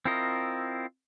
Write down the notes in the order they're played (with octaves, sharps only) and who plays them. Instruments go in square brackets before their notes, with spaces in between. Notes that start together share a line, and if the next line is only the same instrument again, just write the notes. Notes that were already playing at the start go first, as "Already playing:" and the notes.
[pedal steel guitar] C4 E4 F4 A#4 D#5